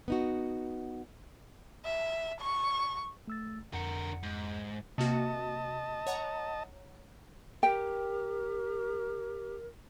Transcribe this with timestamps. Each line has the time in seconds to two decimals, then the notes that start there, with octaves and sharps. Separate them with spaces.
0.08 B3 D#4 F#4
1.85 E5
2.41 C#6
3.28 A3 E6 A6
3.73 F2 D3 A#4 F#5 C#7
4.23 G#2
4.98 C3 A#3 F#4 D#5 A5
6.07 C#5 F#5 A#5
7.63 G4 A#4 G5